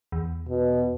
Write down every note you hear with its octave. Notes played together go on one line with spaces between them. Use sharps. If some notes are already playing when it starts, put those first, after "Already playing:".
E2
B2